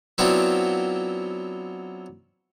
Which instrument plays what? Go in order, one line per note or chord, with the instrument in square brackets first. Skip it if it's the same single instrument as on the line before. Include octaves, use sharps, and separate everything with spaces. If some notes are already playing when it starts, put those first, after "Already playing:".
[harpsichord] F#3 B3 C4 D4 E4 F4